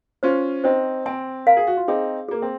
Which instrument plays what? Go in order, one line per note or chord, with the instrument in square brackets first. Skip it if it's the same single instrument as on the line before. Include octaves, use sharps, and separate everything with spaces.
[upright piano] C#4 F4 [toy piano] C5
[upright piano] C4 D#4 [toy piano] C5
[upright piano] C4 [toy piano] G#5
[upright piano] A#4 [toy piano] F5
[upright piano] G#4
F#4
F4
[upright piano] C4 D#4 [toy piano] G#4
[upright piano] A#3 [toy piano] G#4
[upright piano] C4